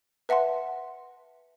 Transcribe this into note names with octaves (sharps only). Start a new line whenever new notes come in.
B4 E5 F#5 A5 C6